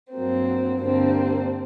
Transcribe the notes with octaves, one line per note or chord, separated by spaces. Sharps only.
G2 F#3 A#3 C4
G2 D3 G3 A#3 C4